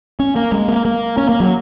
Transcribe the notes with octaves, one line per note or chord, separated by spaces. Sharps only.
C#4
A#3
G#3
A#3
A#3
C#4
A#3
F#3